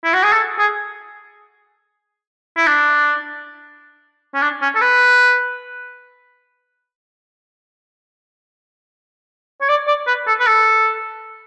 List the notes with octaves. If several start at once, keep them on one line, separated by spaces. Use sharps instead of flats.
E4
F#4
G#4
A4
G#4
E4
D4
C#4
D4
C#4
A4
B4
C#5
D5
D5
B4
A4
B4
A4